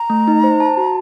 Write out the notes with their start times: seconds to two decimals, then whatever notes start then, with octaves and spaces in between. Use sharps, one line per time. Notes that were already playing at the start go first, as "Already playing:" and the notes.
Already playing: A#5
0.10 A3
0.27 D#4
0.44 C5
0.60 A5
0.77 F#4